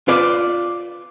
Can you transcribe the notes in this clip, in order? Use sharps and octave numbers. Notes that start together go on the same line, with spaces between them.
F4 B4 D5